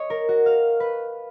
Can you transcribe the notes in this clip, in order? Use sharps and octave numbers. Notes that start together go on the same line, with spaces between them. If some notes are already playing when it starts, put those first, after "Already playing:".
Already playing: C#5 D#5
A#4
F#4
F5
B4